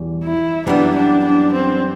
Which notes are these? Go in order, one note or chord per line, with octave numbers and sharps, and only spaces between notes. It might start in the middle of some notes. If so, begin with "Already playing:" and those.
Already playing: E2 B2 G3
E4
F#2 E3 G3 B3 D4
D4
D4
C4